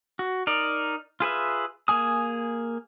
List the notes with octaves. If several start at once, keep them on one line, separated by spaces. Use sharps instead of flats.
F#4
D#4 A#4 D5
F4 G#4 B4 E5
A#3 G#4 G#5 D#6